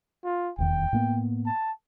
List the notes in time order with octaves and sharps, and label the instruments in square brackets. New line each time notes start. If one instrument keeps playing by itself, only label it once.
[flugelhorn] F4
[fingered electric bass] D#1 E2 D#3 [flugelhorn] G5
[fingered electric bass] A2 A#3 B3
[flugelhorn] A5